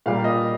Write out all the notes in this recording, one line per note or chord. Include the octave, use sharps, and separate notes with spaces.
A#2 G3 A#3 F5
D#5